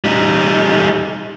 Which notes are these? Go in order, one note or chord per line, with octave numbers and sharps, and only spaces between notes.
G3 D#4